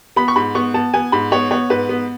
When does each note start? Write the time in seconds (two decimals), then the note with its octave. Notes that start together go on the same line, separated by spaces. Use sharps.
0.16 B3 B5
0.28 C#6
0.36 G#2 B5
0.55 B3 C#6
0.74 B3 A5
0.94 B3 G#5
1.12 G#2 B5
1.32 B3 C#5
1.51 B3 C#5
1.70 G#2 B4
1.89 B3